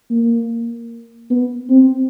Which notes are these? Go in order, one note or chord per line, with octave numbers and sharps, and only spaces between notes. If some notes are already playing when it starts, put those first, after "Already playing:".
A#3
B3
C4